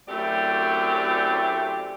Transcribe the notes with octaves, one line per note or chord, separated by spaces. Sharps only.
F#2 A2 A3 C4 G4 D5